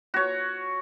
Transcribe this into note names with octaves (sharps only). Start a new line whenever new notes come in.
F#4 C#5